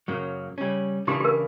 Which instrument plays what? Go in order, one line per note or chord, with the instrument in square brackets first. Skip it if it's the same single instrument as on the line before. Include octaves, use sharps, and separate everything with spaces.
[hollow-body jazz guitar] F#2 C#3 F#3 A#3
C#3 G3 C#4
[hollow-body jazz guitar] C#3 E3 A#3 D4 [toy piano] G4
[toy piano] G4
A#4